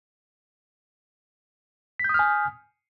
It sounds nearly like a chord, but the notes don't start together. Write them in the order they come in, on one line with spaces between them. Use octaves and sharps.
B6 G6 D#6 F6 G#5